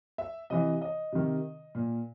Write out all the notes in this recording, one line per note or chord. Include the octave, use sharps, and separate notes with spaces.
E5
C3 E3 D#5
D#5
C3 D#3
A#2